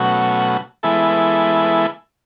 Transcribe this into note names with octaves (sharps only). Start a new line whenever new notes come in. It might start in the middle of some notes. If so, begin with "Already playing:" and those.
Already playing: B2 F#3 A3 C#4 F#4
E3 G#3 B3 E4 A4